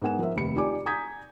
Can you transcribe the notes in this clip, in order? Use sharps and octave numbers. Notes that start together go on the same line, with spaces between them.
G#2 B3 A#4 F#5 G#5 E7
F3 A#4 C5 E5
F1 D#2 B5 C#7
D#4 F4 G4 D5 G#5 D6
G#5 A#5 D#6 G6 G#6 B6